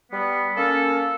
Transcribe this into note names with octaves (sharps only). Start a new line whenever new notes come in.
G3 B3
A#3 C#4 A4